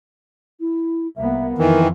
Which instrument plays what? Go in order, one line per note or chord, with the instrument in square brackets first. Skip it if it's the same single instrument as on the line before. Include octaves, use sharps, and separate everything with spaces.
[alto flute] E4
[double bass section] C2 A#3 B3 [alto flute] E5
[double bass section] F2 [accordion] D#3 E3 [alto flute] A#4